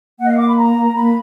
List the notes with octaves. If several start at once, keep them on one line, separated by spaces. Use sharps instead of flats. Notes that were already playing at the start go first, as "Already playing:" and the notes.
A#3 D#5 F#5
F5
D6
B5
A#5
A#3 B5